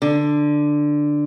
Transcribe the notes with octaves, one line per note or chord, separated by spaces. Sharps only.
D3